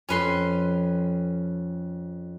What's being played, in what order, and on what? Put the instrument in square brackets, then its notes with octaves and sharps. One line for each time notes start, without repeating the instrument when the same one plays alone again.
[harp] F2 [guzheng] C#4 B4 C6